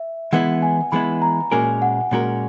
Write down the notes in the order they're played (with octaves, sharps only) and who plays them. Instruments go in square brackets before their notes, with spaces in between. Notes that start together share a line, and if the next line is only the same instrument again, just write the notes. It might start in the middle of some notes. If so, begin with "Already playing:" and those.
Already playing: [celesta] E5
[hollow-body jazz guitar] E3 G#3 B3 E4 [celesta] F#5
[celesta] G#5
[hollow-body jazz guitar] E3 G#3 B3 E4 [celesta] B5
[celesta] A#5
[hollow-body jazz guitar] A#2 G#3 C#4 F#4 A#4 [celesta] G#5
[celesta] F#5
[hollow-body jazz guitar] A#2 G#3 C#4 F#4 A#4